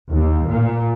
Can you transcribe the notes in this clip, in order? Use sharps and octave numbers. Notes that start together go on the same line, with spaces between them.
D#2
A#2